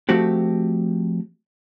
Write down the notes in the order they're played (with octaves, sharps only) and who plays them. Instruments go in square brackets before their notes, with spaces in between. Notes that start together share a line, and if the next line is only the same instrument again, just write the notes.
[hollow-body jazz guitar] F3 A3 C4 F#4 G4